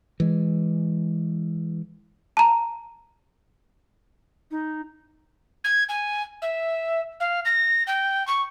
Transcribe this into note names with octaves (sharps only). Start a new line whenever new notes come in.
E3 G#3
A5 A#5
D#4
G#6
G#5
E5
F5
A#6
G5
C#6